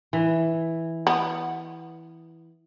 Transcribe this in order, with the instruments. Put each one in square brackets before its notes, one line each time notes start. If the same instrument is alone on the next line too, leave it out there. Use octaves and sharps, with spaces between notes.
[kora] E3
[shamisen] B3